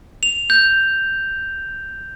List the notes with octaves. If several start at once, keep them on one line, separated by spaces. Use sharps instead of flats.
F7
G6